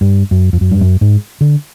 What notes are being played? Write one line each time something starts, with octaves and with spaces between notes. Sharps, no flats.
G2
F#2
F2
F#2
G2
F#2
G#2
D3